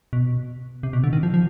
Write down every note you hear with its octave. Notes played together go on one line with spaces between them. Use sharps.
B2
C3
B2
D3
D#3
F3
F3